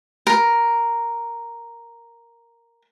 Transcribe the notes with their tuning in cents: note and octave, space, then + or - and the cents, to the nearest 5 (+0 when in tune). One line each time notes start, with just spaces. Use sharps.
A#4 +0